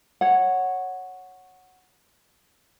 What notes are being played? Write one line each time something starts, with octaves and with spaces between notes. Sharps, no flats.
C#5 F#5